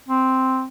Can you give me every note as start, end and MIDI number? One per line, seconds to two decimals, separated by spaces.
0.08 0.66 60